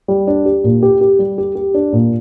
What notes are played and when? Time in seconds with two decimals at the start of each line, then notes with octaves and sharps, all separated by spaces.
0.08 G3
0.27 D4
0.45 G4
0.64 A#2
0.83 G4
1.01 G4
1.19 G3
1.38 G4
1.55 G4
1.74 D4
1.93 A#2